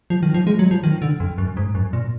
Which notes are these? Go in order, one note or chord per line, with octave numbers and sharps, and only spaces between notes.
F3
D#3
F3
G#3
F#3
F3
D#3
D3
F2
F#2
G#2
F#2
A#2